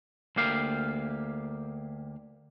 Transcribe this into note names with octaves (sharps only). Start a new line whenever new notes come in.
D2 A#3 G4 F5